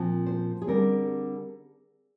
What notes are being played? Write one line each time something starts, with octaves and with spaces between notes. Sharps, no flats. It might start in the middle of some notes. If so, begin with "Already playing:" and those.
Already playing: A#2 F3 C4
C5
G#4
D3 G3 C4 A#4